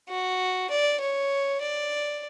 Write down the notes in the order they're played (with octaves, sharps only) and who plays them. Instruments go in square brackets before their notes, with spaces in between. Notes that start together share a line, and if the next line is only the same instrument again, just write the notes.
[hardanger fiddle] F#4
D5
C#5
D5